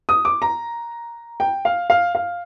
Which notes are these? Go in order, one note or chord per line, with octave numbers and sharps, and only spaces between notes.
D#6
D6
A#5
G5
F5
F5
F5